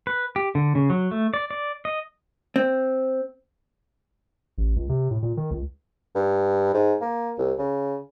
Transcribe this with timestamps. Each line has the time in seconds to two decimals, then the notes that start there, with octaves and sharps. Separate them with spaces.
0.07 B4
0.36 G4
0.55 D3
0.75 C#3
0.90 F#3
1.11 A3
1.34 D5
1.51 D5
1.85 D#5
2.56 C4
4.58 A1
4.76 C#2
4.89 C3
5.11 A2
5.23 A#2
5.37 D#3
5.51 C#2
6.15 G2
6.74 G#2
7.01 A#3
7.38 C2
7.59 C#3